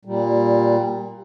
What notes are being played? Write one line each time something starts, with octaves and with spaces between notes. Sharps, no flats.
A#2 G3